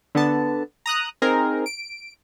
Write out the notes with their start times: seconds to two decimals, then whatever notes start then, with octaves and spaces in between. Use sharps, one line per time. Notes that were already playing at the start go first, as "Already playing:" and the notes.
0.15 D3 B3 A5
0.86 A#5 D#6 F#6
1.22 C4 D#4 G#4 A#4
1.66 D7